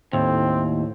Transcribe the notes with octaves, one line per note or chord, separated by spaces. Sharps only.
D#2 A2 C4